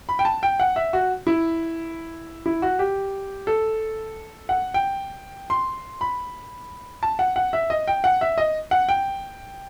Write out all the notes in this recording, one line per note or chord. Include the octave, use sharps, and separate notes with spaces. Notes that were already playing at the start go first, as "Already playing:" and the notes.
B5
G5
A5
G5
F#5
E5
F#4
E4
E4
F#4
G4
A4
F#5
G5
C6
B5
A5
F#5
F#5
E5
D#5
G5
F#5
E5
D#5
F#5
G5